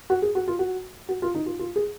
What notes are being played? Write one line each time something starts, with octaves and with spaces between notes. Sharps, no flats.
F#4
G#4
F#4
F4
F#4
F#4
F4
D#4
F4
F4
G#4